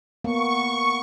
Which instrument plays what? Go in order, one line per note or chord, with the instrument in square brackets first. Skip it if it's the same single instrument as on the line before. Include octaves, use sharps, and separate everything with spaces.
[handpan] A#3 B3 [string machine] C#6